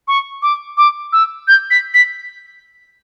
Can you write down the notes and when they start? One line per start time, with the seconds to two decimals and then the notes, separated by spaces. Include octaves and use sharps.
0.08 C#6
0.42 D6
0.77 D6
1.13 E6
1.48 G6
1.71 B6
1.94 B6